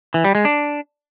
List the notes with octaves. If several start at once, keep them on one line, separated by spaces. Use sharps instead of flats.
E3
G3
G#3
D4